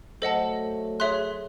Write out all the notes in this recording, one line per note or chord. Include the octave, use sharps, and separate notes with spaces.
F#3 A3 A4 C5 D#5 F#5 A5
G#4 C#5 E5 C6 F#6